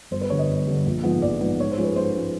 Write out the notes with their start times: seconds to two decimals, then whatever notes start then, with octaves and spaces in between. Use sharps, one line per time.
0.11 G1 C5
0.21 B4
0.30 G2 D3 C#5
0.39 D#5
0.49 G1
0.67 G2 D3
0.86 A#1
1.04 G#2 F3 G#3 B3
1.22 A#1 D5
1.41 G#2 F3 G#3 B3
1.60 G#2 C#5
1.71 C5
1.78 F3 G#3 C#4
1.84 B4
1.96 G#2 C5
2.15 F3 G#3 C#4